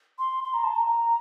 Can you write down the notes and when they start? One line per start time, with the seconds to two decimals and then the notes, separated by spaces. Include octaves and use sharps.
0.19 C6
0.44 C6
0.54 A#5
0.64 A5
0.75 A#5